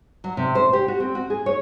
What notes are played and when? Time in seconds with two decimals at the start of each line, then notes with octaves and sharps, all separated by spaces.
0.24 F#3
0.37 C3
0.55 C5
0.73 G4
0.88 F#4
1.00 C4
1.15 F#4
1.30 G#4
1.46 C#5